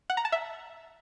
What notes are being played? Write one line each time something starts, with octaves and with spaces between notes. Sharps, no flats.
F#5
A#5
A5
E5